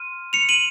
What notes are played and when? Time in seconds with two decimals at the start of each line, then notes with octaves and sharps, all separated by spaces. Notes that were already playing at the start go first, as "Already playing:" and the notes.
Already playing: C6 F6 D#7
0.33 C#7 F7
0.49 D#7 F#7